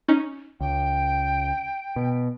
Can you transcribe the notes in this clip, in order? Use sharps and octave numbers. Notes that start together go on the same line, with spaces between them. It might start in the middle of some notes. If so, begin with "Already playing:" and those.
C#4 D#4
C#2 G5
B2